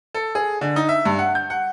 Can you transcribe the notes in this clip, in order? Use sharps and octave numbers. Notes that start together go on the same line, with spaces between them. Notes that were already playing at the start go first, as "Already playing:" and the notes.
A4
G#4
D3
D#4
E5
G2
F#5
G6
F#5